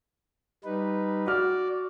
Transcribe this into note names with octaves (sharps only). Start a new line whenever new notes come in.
G3 D#4 B4
F#4 D5 F6